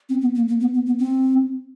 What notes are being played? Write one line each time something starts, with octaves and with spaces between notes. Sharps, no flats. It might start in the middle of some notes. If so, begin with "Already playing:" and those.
C4
B3
A#3
A#3
B3
B3
B3
C4